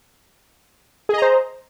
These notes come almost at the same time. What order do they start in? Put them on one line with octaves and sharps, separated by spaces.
G#4 D#5 A#5 C5